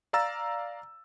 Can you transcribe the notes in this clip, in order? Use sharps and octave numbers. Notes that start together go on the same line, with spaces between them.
D5 F5 A#5 E6 A6